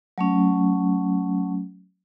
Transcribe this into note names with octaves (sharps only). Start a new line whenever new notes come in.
F#3 A3 C#4